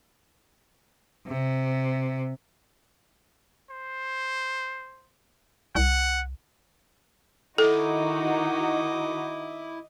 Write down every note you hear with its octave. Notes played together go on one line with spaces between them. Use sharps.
C3
C5
C2 F#5
D#3 D#4 E4 F#4 A4 D#5 D6